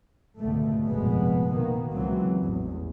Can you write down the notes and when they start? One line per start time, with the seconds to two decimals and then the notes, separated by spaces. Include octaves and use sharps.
0.39 G#1 C#2 B2 D3 A3
0.87 F1 A#1 G2 B2 G#3 B3
1.54 B2 D#3 A#3 B3
1.92 C#2 E3 F#3 C4
2.40 A1 E2